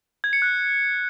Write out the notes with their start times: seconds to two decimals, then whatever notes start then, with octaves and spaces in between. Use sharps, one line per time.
0.24 G#6
0.33 C#7
0.42 F#6